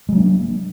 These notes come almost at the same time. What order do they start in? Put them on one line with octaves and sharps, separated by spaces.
G#3 F#3 D4 A#3